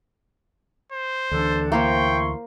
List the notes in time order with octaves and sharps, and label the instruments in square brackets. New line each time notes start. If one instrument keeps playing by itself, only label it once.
[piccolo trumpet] C5
[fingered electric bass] D2 E3 [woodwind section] D4 A4
[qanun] A#3 A#4 C5 [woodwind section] E4 C6 C#6 [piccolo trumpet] G5